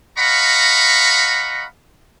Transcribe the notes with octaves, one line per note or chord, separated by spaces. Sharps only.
D#5 F5 F#5 A#5 B5 C#6